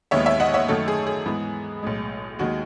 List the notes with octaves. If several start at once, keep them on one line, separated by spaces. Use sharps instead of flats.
D#2 D#3 G#3 B3 C#5 E5
C#5 E5
D#5 F#5
C#5 E5
F#2 D#3 A3 A4 C#5
G#4
G#4
G#2 E3 B3
B1 A2 G#3
D#2 D#3 G#3 F#4